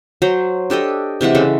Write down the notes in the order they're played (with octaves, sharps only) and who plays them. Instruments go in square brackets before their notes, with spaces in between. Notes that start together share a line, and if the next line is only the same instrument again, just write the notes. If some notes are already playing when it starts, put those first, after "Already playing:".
[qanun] F#3 C5 A#5
D4 G4 A4 D#5
C3 E3 G#3 F#5
C#3 G#3 A4